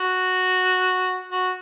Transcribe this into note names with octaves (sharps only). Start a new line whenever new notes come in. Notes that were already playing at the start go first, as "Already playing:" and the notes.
Already playing: F#4
F#4